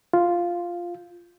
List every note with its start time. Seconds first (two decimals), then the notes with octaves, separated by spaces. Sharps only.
0.13 F4